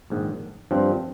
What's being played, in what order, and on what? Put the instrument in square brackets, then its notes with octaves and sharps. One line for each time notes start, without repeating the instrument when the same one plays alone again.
[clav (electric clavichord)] A#1 G#2 D#3
G2 F3 C4